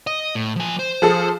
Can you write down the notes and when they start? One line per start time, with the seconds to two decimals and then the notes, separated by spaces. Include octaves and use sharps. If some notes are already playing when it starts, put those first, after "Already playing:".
0.07 D#5
0.35 A2
0.56 F3 G#5
0.79 C5
1.02 F3 G#4 A4